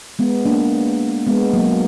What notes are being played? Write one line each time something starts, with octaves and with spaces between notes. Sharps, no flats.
G#3 B3
A#3 D4
G#3 B3
F#3 A#3